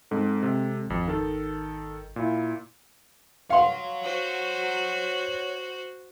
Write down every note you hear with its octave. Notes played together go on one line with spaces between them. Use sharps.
G#2 G#3 C4 A4
C3
G#1 F2
D#3 A4
A#2 E4
C#5 F5 F#5 C6
F#4 C5